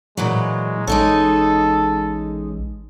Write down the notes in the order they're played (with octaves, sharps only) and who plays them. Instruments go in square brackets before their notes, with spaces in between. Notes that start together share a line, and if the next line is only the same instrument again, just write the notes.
[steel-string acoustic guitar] A#2 E3 F#3 [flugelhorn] G#3
[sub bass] A1 [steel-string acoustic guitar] G#3 D#4 C#5 [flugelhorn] A4